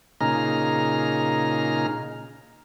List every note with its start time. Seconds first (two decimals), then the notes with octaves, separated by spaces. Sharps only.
0.21 A#2 C#3 D#4 G#4 A#5 F6